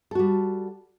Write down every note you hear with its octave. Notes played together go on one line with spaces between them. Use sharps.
G3 F#4 A4